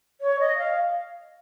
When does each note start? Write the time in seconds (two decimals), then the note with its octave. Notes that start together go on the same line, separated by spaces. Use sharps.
0.20 C#5
0.39 D#5
0.57 F5